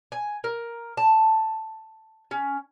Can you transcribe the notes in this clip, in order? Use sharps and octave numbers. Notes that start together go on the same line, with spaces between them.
G#5
A#4
A5
C#4